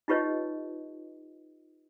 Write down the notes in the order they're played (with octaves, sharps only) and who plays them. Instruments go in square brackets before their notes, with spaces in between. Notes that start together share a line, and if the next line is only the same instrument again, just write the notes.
[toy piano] D#4 F4 G4 B4 C#5 D#5